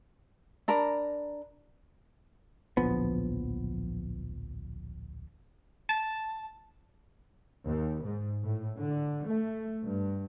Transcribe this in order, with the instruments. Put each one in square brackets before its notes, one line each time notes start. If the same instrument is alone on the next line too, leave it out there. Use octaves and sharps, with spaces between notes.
[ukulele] D4 A#4 A#5 B5
[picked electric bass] D1 A#1 F3 B3
[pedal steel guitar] A5
[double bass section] D#2
G#2
A2
D3
A3
G2